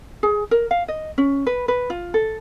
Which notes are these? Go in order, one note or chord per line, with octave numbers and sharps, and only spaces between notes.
G#4
A#4
F5
D#5
C#4
B4
B4
F4
A4